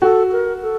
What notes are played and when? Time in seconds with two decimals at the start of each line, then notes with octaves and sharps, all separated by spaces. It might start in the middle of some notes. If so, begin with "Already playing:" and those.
0.02 F#4 A4
0.32 A#4
0.62 A4